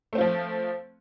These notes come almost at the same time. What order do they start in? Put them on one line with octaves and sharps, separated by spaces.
A3 C4 F4 F3